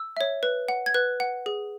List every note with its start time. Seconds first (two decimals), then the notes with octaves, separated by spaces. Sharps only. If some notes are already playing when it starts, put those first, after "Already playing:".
Already playing: E6
0.17 C#5 E5
0.43 B4
0.68 F#5
0.86 G#6
0.94 B4 F#6
1.20 F#5
1.46 G#4